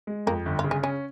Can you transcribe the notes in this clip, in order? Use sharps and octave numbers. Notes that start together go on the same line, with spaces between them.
G#3
F2 A#3
G1
F4
C#3
G#3
G#3 C#4